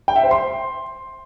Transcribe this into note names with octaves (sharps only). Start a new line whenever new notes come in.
G5
E5
C5
C6